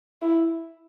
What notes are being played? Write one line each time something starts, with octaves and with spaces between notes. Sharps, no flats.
E4